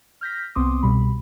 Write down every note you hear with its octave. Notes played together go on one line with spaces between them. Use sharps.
F6 G6 A#6 B6
C2 B3 C4 C6 D6 D#6
C2 B2 G3 B5